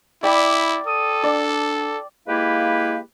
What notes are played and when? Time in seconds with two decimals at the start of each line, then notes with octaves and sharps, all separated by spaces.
0.23 E4 D5 G5 B5 D6
0.87 A4 D#6
1.24 D4 D5
2.27 G#3 A#3 E4 G4 B4 F5